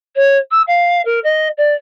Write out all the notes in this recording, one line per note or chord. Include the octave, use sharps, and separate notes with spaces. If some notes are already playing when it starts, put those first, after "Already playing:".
C#5
E6
F5
A#4
D#5
D5